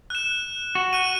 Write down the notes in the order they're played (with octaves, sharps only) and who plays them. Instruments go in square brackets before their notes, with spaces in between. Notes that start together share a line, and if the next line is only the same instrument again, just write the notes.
[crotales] F#6 E7
[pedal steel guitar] F#4
[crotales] F#6 D#7